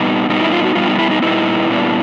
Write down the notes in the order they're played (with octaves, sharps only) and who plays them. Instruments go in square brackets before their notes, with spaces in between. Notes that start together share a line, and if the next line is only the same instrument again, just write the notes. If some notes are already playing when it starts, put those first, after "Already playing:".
Already playing: [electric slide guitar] A#2 G3 B3 D#4
A#2 G3 B3 D#4
E4
F4
F#4
A#2 G3 B3 D#4 F4
D#4
E4
D#4
A#2 G3 B3 D#4 E4
A#2 G3 B3 D4